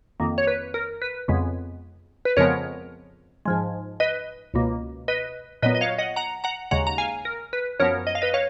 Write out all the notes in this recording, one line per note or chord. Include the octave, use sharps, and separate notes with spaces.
F2 D#3 A#3
C#5
B4
A#4
B4
F2 C#3 G#3 B3
B4
F2 C#3 F3 G#3 B3 A#4 C#5
G#2 F3 G#3
B4 D#5
C#2 B2 A#3
B4 D#5
A#2 F#3 B3 B4 D#5
D#5
C#5 F5
D#5 F#5
F#5 A#5
F#5 A#5
D#2 C#3 G#3 F#5 A#5
A#5
F5 G#5
A#4
B4
F#2 F3 B3 A#4 C#5
D#5
F5
B4 D#5
C#5 F5